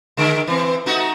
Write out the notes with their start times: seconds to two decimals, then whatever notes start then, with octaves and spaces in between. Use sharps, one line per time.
0.17 D3 G#3
0.47 E3 C4
0.86 A3 D#4 F#4